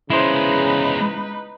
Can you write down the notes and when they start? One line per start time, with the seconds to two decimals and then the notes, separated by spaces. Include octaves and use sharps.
0.10 C#3 G#3 B3 D#4 E4 B4 C5